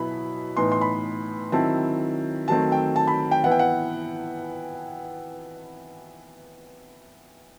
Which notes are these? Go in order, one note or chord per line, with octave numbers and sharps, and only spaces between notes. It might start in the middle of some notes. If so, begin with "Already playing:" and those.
Already playing: B2 F#3 B3 E4 B5
A2 E3 B3 D#4 C6
C6
B5
D#3 F#3 C4 E4 A5
D#3 F#3 A3 C4 A5
G5
A5
B5
G5
E3 B3 E4 F#5
G5
F#5